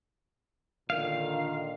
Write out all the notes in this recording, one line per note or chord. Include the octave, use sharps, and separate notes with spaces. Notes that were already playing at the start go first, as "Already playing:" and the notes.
A#2 D3 D#3 F5